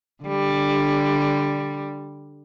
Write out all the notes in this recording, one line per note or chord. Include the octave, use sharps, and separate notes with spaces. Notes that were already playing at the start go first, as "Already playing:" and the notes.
D3 G3